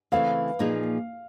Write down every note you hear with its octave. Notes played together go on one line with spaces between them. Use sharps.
C#3 E3 A3 C4 F5
A#2 F3 A#3 D#4 G#4